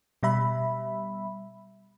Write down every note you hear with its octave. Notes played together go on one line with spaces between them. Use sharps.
B2 G3 E5 B5